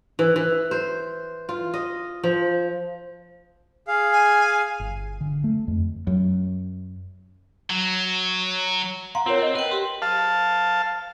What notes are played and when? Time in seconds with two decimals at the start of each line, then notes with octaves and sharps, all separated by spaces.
0.19 E3
0.36 E3
0.71 C5
1.49 F4
1.74 D#5
2.23 F3
3.88 G#4 F5
4.13 G#5
4.80 G1
5.21 D3
5.44 A3
5.68 F2
6.07 F#2
7.70 F#3
9.15 F5 F#5 A#5 C6
9.26 C4 F4 A#4 C#5
9.42 D#5
9.55 A#4 B4 G5
9.71 G4 C6
10.02 F5 A5